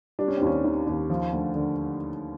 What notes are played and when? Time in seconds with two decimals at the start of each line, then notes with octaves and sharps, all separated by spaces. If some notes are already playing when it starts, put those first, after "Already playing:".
0.19 G3 D4
0.28 C#4
0.37 D#2 C4
0.46 C#4
0.64 D#3
0.87 D#2
1.10 F3
1.33 D2
1.55 D3